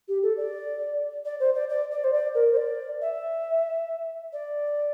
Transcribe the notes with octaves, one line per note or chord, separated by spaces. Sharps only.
G4
A4
D5
D5
C5
D5
D5
D5
C5
D5
A#4
C5
D5
E5
D5